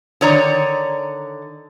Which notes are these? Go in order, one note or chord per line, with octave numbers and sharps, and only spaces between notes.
D3 D#3 C#5 D5 A#5